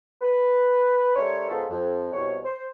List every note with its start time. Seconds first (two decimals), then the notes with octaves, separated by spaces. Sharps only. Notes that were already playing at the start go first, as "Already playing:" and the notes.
0.22 B4
1.16 G3 A3 C#4 A#4 C5 C#5
1.49 C#2 G#2 B3 F4 A4
1.70 F2
2.14 C2 B2 C#5
2.45 C5